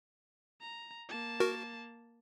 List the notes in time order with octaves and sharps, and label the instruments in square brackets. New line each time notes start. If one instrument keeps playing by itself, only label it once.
[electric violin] A#5
A#3 A5
[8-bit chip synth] F#4 A#4